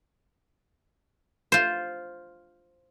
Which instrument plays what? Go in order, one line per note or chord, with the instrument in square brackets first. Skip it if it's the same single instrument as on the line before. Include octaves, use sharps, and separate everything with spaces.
[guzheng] F4 C5